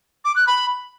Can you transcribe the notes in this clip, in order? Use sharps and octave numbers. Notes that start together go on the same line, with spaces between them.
D6
F#6
B5